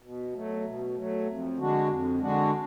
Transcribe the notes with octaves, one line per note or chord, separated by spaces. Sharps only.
B2
F#3 A3
B2
F#3 A3
F2
D3 G#3 D4 F#4
F2
D3 G#3 D4 F#4